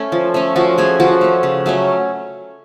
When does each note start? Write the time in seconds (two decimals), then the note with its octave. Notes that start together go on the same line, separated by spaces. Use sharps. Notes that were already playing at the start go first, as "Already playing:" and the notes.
Already playing: A3 C#4
0.12 F3
0.34 A3 C#4
0.56 F3 F#4
0.78 A3 C#4 G#4
1.00 F3 F#4
1.21 A3 C#4
1.43 C#3
1.66 F#3 A3 C#4